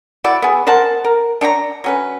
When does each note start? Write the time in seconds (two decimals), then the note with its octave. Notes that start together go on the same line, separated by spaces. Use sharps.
0.24 E4 F#4 D5
0.42 B3 G#4
0.67 A#4 C5 F#5 A5
1.04 A#4
1.41 D4 C#5 G5 A#5
1.84 F#3 C#4 B4